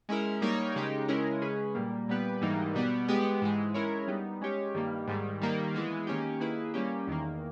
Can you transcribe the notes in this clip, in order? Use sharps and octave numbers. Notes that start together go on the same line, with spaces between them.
G#3 C#4 E4 A#4
G3 A#3 D#4 A#4 C#5
C#3 G#3 D#4 G4
C#3 G#3 C#4 E4 A#4
C#3 G#3 C#4 G#4 B4
A#2 G3 A#3
A#2 G3 B3 G4 B4
G#2 E3 G3 A#3 D#4
B2 G3 B3
G#3 B3 G4
G#2 E3 G#3
G#3 C#4 E4 A#4 C#5
G3 B3 D#4
G#3 C#4 G4 C#5
G2 D#3 G3 A#3
G#2 D#3 G3
D#3 G3 A#3
E3 G#3 B3
D#3 A#3 C#4 G4
D#3 A#3 E4 G#4 B4
G3 A#3 C#4 G4
E2 D#3 A#3